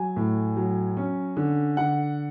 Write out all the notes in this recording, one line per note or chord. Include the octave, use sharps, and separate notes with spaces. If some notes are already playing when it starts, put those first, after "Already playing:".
Already playing: F#3 G#5
A2
F#3
C#4
D3
D3 F#5